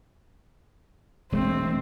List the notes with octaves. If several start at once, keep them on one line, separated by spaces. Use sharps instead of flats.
E1 G#3 A3 C4